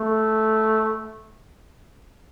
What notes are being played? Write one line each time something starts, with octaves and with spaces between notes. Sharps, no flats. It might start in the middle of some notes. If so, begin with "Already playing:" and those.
Already playing: A3